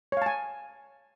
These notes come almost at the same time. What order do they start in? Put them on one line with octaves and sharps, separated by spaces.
C#5 F5 A5 G#5